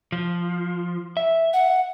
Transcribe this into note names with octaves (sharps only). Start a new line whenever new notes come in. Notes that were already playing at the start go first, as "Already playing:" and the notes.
F3
E5
F#5